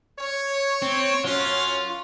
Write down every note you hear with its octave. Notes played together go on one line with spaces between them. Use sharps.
C#5
C4
F#2 F#3 C#4 F4